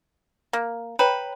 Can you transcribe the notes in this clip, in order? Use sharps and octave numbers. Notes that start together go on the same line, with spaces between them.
A#3
B4 C#5 G5 A#5